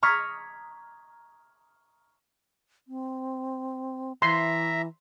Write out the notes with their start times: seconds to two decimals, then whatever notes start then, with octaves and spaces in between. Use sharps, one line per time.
0.03 A#5 C#6 D#6 F6 G#6 B6
2.88 C4
4.22 E3 E5 A#5 C6